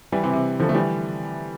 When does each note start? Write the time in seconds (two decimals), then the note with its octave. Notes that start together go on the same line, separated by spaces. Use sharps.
0.12 E3 G3
0.23 C3 E3
0.33 C3
0.59 D3 F3
0.69 A3
0.75 E3 G3